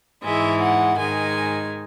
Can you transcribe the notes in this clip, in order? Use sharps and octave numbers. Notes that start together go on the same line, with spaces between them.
G#2 E3 G#3 E5
F#5
G#2 D#3 G#3 G#5